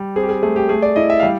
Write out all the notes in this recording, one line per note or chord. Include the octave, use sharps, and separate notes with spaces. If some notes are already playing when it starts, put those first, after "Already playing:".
Already playing: G3
C4 G#4
G4
G#4
A3 G#4
G4
A3 G#4
D5
E4 D#5
E5
G3 F5